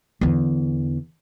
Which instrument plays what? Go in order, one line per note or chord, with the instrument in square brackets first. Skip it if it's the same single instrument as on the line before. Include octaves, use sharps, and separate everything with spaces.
[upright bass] E2 D3